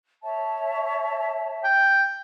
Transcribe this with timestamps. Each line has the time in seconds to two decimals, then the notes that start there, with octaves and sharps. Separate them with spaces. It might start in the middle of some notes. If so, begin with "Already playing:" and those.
0.22 C#5 E5 A5
1.64 G5